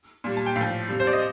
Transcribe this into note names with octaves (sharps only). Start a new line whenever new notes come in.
A#2 G3
A5
G5
A2 F5
F3
C3 G3
C5
D5
D#5